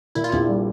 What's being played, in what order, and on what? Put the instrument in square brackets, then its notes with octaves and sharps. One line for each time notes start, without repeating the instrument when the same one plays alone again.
[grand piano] A#2 [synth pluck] E4
[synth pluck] F4
[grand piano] A#1 [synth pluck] E4
[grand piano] G3